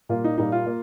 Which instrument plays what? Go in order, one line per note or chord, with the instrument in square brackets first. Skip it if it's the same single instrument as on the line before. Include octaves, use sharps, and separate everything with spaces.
[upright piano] A#2 G3 A#3 F4
D#4
A#2 G3 A#3 D#4
F4
A#3